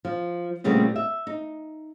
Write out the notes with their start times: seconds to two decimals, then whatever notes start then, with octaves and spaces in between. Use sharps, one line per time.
0.05 F3
0.64 A#2 C#3 G3 A3 B3 C4
0.96 E5
1.27 D#4